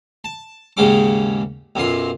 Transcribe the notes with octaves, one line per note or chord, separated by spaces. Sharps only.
A5
D#2 G#2 C#3 G#3 C#4 D6
B1 F#2 F4 C6